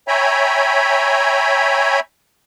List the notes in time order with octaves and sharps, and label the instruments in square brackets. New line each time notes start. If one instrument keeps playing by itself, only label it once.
[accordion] C#5 E5 G5 G#5 A#5 B5